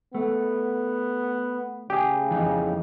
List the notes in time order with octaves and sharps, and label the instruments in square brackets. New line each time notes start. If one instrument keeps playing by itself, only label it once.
[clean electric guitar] A3 [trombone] B3
[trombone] C#3 [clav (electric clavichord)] G4 G#4
[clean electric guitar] F2 E3 D#4